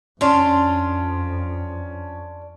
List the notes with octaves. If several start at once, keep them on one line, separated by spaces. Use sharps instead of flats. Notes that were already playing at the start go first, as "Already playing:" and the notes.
F2 C#4 D4 F4